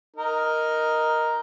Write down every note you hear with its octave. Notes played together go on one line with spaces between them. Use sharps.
D#4 A#4